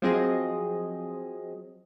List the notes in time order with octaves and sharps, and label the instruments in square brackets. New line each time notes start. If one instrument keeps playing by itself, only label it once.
[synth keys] F3 F#3 C4 G#4 D#5